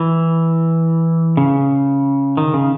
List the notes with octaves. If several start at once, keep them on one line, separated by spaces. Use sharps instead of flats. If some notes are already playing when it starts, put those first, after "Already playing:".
Already playing: E3
C#3
D#3
C#3